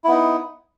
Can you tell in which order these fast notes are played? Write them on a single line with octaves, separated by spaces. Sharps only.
E4 B3 D#4